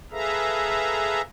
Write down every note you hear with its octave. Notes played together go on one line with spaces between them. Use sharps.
G#4 A4 B4 E5 F5 A#5